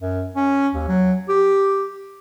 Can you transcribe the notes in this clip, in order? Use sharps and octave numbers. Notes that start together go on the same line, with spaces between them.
F#2
C#4
D#2
F#3
G4